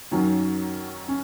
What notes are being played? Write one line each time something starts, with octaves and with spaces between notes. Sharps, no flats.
F#2 D#3 F#3 C#4
C#4